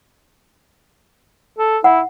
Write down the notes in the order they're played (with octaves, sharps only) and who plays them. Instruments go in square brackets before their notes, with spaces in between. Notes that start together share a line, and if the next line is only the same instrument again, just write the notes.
[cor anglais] A4
[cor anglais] E4 [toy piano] F#5